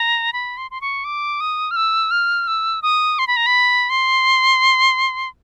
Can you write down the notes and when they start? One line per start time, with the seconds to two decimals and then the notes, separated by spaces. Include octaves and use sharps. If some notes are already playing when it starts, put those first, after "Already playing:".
Already playing: A#5
0.33 B5
0.57 C6
0.71 C6
0.81 C#6
1.05 D6
1.41 D#6
1.71 F6
1.76 E6
2.11 F6
2.47 E6
2.82 D#6
3.19 C6
3.27 B5
3.37 A#5
3.46 B5
3.90 C6